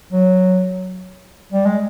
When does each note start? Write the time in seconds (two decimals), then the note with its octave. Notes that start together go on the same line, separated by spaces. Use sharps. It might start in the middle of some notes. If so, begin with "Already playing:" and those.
0.12 F#3
1.52 G3
1.66 G#3